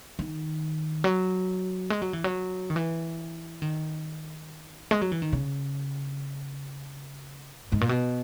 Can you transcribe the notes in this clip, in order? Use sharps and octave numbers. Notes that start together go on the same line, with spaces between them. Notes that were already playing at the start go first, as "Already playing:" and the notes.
D#3
F#3
G#3
F#3
E3
F#3
D#3
E3
D#3
G#3
F#3
E3
D#3
C#3
F#2
G#2
A#2
B2